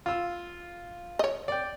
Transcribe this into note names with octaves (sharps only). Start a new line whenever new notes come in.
F4 E6
C#5 D#5
D5 G5